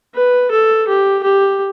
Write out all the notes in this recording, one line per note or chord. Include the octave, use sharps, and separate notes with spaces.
B4
A4
G4
G4